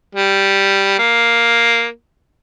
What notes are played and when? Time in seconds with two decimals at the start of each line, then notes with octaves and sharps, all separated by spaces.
0.15 G3
0.99 A#3